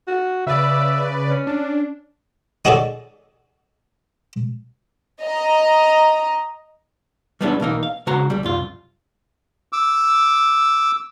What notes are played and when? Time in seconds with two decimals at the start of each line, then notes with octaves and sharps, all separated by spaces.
0.08 F#4
0.47 C#3 B4 D5 E5
1.30 C#4
1.47 D4
2.65 D#4 F#4 G#4 A4 C#5 D5
5.22 D#5 A#5
7.41 G3 G#3 B3 C#4 D4 E4
7.60 B1 E3 A#3 D#4
7.83 F5
8.07 C#3 G#3 F#4 C5 A#5
8.30 C2 G3
8.43 C2 F#2 F4
9.73 D6 E6